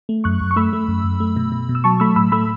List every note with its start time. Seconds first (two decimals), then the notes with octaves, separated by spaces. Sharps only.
0.09 A3
0.24 F#2 C#6 F#6
0.41 F#2
0.51 C#6
0.56 A3 B5 E6
0.73 A3
0.88 F#2
1.04 F#2
1.20 A3
1.36 B2
1.52 B2
1.69 B2
1.75 E6
1.84 F#3 A5 C#6
2.00 A3 B5 E6
2.16 A2 B5 E6
2.32 A3 B5 E6